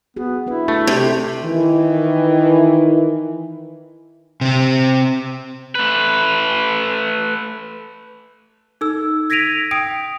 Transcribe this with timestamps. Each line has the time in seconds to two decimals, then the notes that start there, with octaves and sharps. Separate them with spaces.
0.16 B3 F#4 G#4
0.47 B3 D4 E4 B4
0.68 A3 D4
0.87 C3 A4
1.43 D#3 E3
4.41 C3 C4
5.75 A3 B4
8.81 D#4 A4 E6
9.30 G#6 A#6 B6 D7 D#7 F7
9.71 G5 D#6 D7